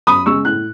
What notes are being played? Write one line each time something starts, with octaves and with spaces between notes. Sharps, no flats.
F#2 B5 D#6
C#3 G#3 C#6 E6
A2 F#6